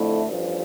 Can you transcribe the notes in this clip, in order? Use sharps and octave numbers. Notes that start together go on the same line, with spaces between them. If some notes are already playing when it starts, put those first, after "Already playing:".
Already playing: F2 D3 A3 E4
A1 G2 F3